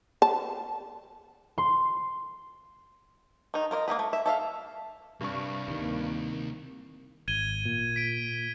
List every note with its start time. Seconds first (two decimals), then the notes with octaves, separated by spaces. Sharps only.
0.22 A5
1.58 C6
3.54 D#3 D#4
3.71 F4 A#4 D5 D#5
3.88 A#3 C4 D#4 B4
3.99 A3
4.13 E5
4.26 A4 E5 F5
5.21 C2 G2 C#6
5.68 D2 C3 D#3 A#3
7.28 G#1 G#6 D#7 G7
7.65 A#2
7.96 B6 D7